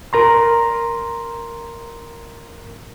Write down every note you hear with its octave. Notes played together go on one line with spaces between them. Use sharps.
A#4 A#5 C6